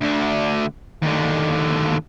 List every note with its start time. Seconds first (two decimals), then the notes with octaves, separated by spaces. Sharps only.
0.01 D2 D3
1.03 D#2 D3